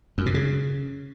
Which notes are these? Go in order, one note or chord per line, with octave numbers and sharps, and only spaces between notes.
F#2
B2
C#3